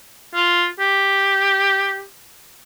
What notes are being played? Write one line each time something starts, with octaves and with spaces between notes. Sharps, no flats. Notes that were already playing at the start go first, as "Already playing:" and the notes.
F4
G4